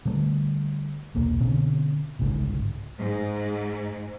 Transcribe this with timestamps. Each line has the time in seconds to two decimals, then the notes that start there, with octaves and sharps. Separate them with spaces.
0.05 D3 G3 A3
1.15 E1 C2 A#3
1.40 B2 D3 C4 C#4
2.19 G1 C2 G#2 C#3
2.99 G#2